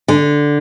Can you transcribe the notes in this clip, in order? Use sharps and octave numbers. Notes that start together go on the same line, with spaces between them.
D3